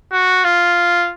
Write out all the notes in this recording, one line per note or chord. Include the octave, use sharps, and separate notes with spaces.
F#4
F4